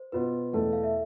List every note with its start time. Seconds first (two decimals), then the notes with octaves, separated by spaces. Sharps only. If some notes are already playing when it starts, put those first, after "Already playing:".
Already playing: C5
0.12 B2 B3 F4 B4
0.53 E2 B2 A3 A4
0.73 F5
0.84 E5